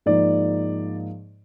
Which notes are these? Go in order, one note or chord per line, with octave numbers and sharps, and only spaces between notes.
G#2 F3 A#3 D#4 D5